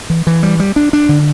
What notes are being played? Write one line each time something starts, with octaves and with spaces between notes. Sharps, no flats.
E3
E3
G3
G3
D4
D4
D3